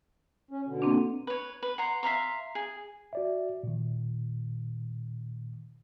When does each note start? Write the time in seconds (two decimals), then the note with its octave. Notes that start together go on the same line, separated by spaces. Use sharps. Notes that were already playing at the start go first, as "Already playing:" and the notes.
0.51 C#4
0.67 B2 D3
0.82 A#3 C4 D4
1.27 B4 C#5
1.63 B4
1.78 F#5 A#5 C6
2.03 E5 F5 A#5 C6
2.55 G#4
3.13 F#4 D5 E5
3.63 A#2 D#3